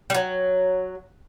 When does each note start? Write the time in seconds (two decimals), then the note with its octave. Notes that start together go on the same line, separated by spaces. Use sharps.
0.10 G3
0.14 F#3